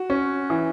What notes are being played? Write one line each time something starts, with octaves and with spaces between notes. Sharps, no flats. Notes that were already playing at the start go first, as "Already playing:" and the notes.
Already playing: F#4
C#4
E3